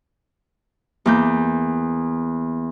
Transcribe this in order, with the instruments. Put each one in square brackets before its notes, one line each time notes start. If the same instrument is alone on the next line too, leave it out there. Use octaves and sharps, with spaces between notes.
[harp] E2 A#3 G6